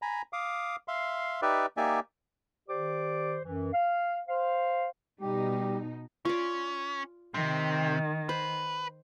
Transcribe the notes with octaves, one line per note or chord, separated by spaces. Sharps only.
G#5 A#5 B5
F5 D6 D#6
E5 F5 C6
D#4 G4 B4 D5 E5
A#3 D#4 G4 D5 E5 G#5
D#3 G4 C5 D5 D6
F#2 E3
F5
C5 F5
B2 G3 D#4 G4
C#4 F4 D5
C3 D#3
B4 C5